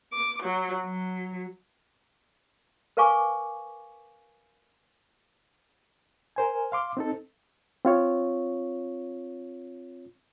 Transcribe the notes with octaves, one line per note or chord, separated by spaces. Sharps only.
D6
F#3
F#3
A#4 B4 F5 G#5 C#6 D6
A#4 C5 G#5
F5 C6 D6
C4 D#4 A4
C4 F4 C#5